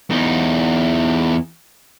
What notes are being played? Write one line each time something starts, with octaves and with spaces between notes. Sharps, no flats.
E2 D#4